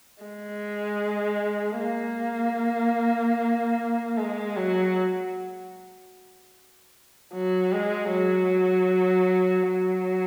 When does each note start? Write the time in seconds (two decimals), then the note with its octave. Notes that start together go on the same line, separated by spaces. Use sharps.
0.23 G#3
1.80 A#3
4.17 G#3
4.56 F#3
7.33 F#3
7.73 G#3
8.11 F#3
9.69 F#3